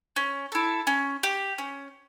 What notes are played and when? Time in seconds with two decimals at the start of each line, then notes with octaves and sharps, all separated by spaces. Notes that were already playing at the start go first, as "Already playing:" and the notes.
0.16 C#4
0.52 E4 A4
0.87 C#4
1.23 G4
1.58 C#4